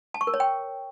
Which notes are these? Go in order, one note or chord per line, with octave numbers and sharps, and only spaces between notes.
A5
C#6
A#4
C#5
G5